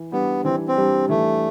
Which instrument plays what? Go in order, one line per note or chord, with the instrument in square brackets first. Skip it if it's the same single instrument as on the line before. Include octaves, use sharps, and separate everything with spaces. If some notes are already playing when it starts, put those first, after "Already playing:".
Already playing: [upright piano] E3
[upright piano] G3 D4 [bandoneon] B3
[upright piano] E3 [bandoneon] C4
[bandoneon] C4
[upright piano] G3 D4
[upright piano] E3 [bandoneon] A3